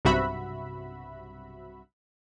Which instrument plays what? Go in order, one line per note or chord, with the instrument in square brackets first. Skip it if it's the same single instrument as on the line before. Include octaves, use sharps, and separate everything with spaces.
[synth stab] B1 G2 C3 F#4 E5 B5